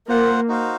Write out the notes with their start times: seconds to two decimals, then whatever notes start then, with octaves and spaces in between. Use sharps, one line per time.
0.09 A#3 F4 C5 F#5
0.48 D#4 F#4 C5 F5